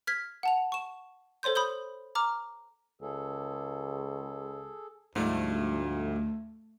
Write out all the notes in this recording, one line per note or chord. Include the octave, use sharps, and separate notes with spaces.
F6 G#6 B6
F#5 A5 F7
C#6 E7
A4 C5 C#5 C6 G6
B5 D#6 G6 G7
A#5 D6 F6
C#2 G#4 A4
D2 G#2 F3 G3 A3 D4